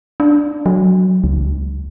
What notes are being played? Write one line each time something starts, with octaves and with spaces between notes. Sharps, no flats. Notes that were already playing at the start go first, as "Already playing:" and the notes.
D4
F#3
C#2